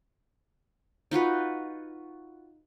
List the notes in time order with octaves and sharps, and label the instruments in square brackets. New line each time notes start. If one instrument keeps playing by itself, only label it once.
[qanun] D#4 F4 F#4 B4